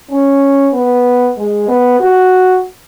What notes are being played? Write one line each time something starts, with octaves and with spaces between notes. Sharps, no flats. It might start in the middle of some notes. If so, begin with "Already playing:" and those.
C#4
B3
G#3
B3
F#4